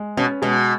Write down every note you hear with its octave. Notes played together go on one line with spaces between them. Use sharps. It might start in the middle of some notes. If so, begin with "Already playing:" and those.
Already playing: G#3
B2 C#4
B2 G#3